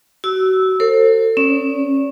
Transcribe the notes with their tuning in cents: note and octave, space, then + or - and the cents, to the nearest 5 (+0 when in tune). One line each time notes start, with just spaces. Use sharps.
F#4 +30 E6 -15
A4 +40 C5 +25
C#4 -20 D5 -40